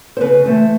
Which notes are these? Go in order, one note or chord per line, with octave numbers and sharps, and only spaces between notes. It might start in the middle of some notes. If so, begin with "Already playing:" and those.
C5
C#3 B4
E3 A3 C5